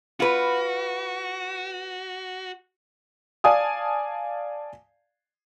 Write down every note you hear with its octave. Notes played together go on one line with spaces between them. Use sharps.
F4 F#4 B4
D5 F5 G#5 A5 D#6